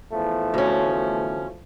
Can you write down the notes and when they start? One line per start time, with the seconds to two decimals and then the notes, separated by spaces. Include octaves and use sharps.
0.12 E2 F3 A3
0.54 D2 C#4